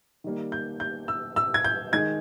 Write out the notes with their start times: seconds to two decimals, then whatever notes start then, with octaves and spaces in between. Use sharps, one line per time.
0.24 D#3 G3 A#3
0.52 G6
0.80 G6
1.08 E6
1.36 E6
1.54 G#6
1.64 G6
1.92 D#3 G#3 D#4 G#6